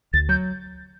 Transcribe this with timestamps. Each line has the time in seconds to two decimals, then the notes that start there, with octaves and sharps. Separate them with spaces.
0.13 D2 A6
0.29 F#3 G6